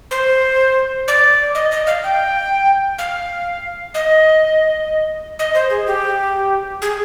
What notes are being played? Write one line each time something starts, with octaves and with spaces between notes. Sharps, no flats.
C5
D5
D#5
D#5
F5
G5
F5
D#5
D#5
C5
G#4
G4
G#4